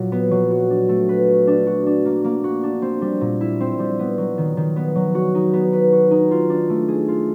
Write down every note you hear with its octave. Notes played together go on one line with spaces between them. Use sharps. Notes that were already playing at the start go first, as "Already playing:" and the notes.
Already playing: A#2 F#3
B3
F#3
F#4
D4
A3
B4
F#4
D4
F#4
D4
A#3
A#3
F#4
D4
C4
G3
A#2
E4
C4
G3
B3
F#3
D#3
D#3
B3
F#3
F#4
D#4
B3
B4
F#4
D#4
F4
D4
A3
G#4
F4